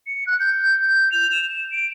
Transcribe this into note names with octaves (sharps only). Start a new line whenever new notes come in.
C#7
F#6
G6
G6
F7
E7
D7